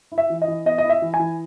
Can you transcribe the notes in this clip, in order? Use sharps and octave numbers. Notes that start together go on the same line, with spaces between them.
E4
E5
E3
D#5
E3
B3 D#5
D#5
E4
E5
E3
G#5
E3